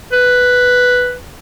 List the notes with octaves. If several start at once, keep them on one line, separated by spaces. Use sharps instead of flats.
B4